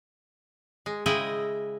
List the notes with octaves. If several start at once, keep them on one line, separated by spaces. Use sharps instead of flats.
G#3
C#3 G#3 E4 D#5 G5